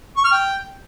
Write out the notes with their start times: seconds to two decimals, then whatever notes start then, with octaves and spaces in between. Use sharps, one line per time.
0.17 C#6
0.24 F6
0.32 G5